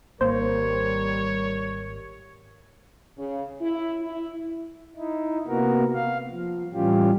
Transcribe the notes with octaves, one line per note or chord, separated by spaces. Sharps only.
G#1 G3 A#3 A#4 C5 C#5
C#3
E4
E4
D#4 E4
C3 A#3 B3 F#4 A#4
F5
F3
A2 E3 G3 C#4 F4 G4